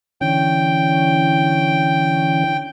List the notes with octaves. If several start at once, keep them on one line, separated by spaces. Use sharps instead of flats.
D3 E3 C#4 G5